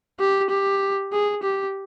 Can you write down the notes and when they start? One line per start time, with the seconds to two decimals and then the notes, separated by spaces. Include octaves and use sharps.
0.19 G4
0.50 G4
1.12 G#4
1.43 G4